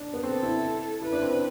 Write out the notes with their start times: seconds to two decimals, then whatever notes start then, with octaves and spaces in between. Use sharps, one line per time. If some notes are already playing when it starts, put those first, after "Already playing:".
Already playing: D4
0.13 B3
0.23 C4 A4
0.43 E4
1.02 E4 B4
1.12 D4
1.22 C4
1.32 D4